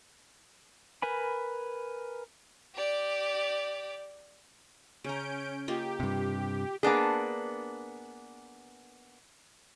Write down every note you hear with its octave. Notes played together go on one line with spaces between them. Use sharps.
A#4 B4 G#5 B5
G4 D5
C#3 C#4 A#5 G6 D7
A#3 F4 G4 D#5
G2 C3
A#3 B3 D4 G#4